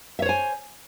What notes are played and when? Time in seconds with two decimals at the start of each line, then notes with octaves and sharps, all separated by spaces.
0.19 E5
0.22 C#5
0.26 C5
0.29 G#5